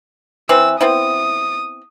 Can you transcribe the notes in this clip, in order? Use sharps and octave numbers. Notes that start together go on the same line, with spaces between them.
E3 C4 B4 E6
B3 C4 E4 D#6